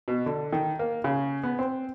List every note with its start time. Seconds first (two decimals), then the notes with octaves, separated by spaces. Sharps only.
0.08 B2
0.26 D3
0.53 D#3
0.79 A#3
1.04 C#3
1.43 B3
1.59 C4